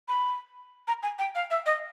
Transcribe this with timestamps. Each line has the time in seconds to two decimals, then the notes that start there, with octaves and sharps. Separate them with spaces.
0.08 B5
0.88 A#5
1.03 G#5
1.19 G5
1.35 F5
1.51 E5
1.66 D#5